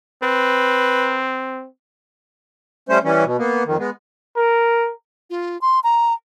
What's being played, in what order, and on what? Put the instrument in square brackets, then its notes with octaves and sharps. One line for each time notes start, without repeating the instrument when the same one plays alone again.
[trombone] C4 [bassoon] B4
[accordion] G3 A3 C#4 C5
E3 G3 C#4
B2
A#3 B3
F2 D#3
G#3 B3
[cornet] A#4
[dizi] F4
C6
A#5